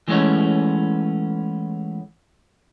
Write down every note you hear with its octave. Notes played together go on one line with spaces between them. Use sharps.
E3 G#3 A3 B3 C#4 C#5